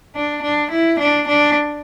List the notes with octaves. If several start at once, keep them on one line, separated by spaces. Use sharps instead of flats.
D4
D4
E4
D4
D4